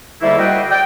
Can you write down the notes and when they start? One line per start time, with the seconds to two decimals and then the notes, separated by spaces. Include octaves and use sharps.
0.21 G#2 D3 G3 A3 A#3 E4
0.38 F#4 C5 D#5 E5 F#5 G5
0.70 D5 G5